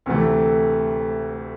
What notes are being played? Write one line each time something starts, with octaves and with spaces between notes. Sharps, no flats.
D2 C3 E3 A3